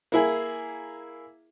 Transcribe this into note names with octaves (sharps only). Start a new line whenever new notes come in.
A#3 E4 G#4